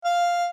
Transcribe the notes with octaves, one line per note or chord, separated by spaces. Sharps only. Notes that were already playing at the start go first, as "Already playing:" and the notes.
F5